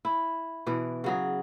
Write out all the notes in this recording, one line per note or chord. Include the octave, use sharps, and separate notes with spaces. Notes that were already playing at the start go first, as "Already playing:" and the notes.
E4
B2 E3 D5
C#3 F#3 G#4